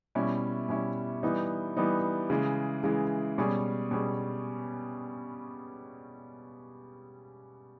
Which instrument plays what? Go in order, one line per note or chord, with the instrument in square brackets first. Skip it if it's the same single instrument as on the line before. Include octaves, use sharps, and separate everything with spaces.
[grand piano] B2 G3 C#4 E4
B2 G3 C#4 E4
E3 G3 B3 D#4
E3 G3 B3 D#4
C#3 E3 G#3
C#3 E3 G#3
B2 G3 C#4 G#4
B2 G3 C#4 G#4